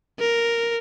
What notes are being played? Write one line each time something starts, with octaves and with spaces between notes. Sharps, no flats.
A#4